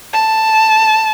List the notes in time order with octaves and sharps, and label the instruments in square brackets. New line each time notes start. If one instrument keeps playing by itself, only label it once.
[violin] A5